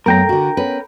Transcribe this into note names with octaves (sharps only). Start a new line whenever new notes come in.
F#2 A3 B3 A#4 G5 A#5
D3 F#4
B3 C#4 B4